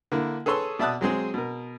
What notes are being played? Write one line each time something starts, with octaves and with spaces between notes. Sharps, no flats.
D3 A#3 E4
G#4 A4 B4 C#5 C6 E6
B2 D5 E5 A5 D#6 F#6
F#3 G#3 C4 G#4
B2 A#4